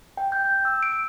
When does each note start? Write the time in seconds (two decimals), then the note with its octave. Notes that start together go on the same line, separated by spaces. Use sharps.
0.17 G5
0.32 G6
0.65 E6
0.83 D7